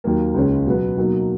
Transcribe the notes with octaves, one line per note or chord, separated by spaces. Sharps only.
D#2 D#3 F#3 A#3
C#2 C#3 G#3 C#4
B2 F#3 B3
B2 F#3 A#3 D#4